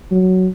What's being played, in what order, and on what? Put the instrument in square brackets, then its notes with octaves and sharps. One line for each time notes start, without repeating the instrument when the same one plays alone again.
[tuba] F#3